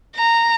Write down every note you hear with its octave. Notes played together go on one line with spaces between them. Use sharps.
A#5